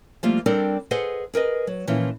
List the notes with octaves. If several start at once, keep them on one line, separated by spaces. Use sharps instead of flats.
F3 G3 A3 A#3 F4
G3 C4 D4 A4 A#4 D5
G#4 A4 B4 C5 D#5 F#5
G#4 A#4 B4 D#5
F#3
A#2 E3 F3 C#4